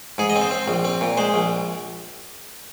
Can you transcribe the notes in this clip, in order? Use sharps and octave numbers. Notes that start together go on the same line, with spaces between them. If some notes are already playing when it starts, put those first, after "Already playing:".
G#2 G#4
D#5
C4
C5
C4
A#1
C4
A#2
G#3 C5
A#1